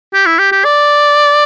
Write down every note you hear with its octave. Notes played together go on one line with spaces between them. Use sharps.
G4
E4
G4
G4
D5